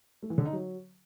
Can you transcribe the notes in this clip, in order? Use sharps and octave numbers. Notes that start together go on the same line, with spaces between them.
A3
E3
D3
D#4
F#3